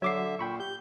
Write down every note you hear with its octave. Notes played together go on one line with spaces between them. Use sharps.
D3 F#3 C#5 E5 D6 C7
A#2 G5 B5 C#6
G4 G6